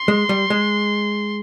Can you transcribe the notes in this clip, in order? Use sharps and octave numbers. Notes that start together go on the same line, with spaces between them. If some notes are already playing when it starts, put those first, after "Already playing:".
Already playing: C6
G#3
G3
G#3